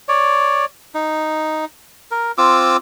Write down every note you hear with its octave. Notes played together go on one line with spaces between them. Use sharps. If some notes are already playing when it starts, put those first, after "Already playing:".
C#5 D5
D#4
A#4
C4 F4 D6 E6